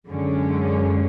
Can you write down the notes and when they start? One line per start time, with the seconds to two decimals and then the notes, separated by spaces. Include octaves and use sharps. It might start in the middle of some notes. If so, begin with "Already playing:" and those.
0.09 F#2 D3 G#3 C#4